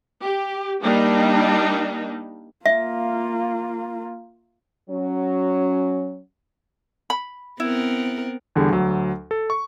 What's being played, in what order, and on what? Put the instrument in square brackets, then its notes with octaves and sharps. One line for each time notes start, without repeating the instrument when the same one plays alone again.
[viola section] G4
G3 A#3 D4 D#4
[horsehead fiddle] A#3 F4 [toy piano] E5
[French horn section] F#3 C#4
[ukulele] B5
[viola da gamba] B3 C4 A#4 [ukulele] E4
[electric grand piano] E2 D3 G3 G#4
D2 F#3
A4
C#6